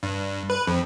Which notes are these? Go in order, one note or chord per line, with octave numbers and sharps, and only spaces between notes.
G2
B4
F2